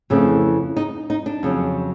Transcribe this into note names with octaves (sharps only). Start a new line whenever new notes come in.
F2 C#3 E3 A3 C4
D#4
D#4
D4
F2 C#3 F#3